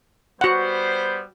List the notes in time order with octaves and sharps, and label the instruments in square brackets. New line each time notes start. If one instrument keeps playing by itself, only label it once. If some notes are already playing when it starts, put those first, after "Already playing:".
[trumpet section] G3 B3 C5 [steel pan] F#4 F#5